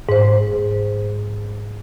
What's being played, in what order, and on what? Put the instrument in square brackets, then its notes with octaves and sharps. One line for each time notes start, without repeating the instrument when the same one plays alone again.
[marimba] G#2 C5